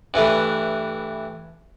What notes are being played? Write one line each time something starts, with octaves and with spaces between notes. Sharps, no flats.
G2 E3 A3